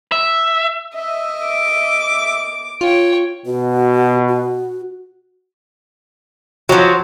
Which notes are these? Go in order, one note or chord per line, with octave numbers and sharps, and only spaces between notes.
E5
D#5 E5
D6
F4 C#5 G5
B2 F#4
F#4
F3 F#3 F#4